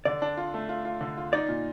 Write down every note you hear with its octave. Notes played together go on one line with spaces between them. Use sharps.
D3 D5
D4
F4
A3
F4
F4
D3
F4
D#4 D5
A#2